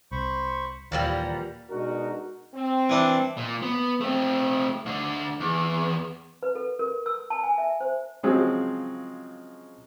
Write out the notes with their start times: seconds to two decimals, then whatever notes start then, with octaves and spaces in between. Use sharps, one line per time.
0.12 C2 C5 B5 C#6
0.92 D#2 A#2 E3 F3 G3 F#5 A#5
1.70 B2 G#3 D4 D#4 F#4 A#4
2.54 C4
2.89 E3 D4
3.38 A#2
3.62 B3
4.01 A3 C4
4.86 D2 D3
5.40 E2
6.43 B4
6.55 A4
6.79 A#4
7.06 E6
7.30 A5
7.44 G#5
7.58 E5
7.81 C5
8.23 C#3 F3 F#3 G#3 C4